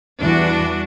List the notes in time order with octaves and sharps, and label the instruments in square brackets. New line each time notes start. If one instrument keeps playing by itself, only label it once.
[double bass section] E2 E3 G3 [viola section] D4 F#4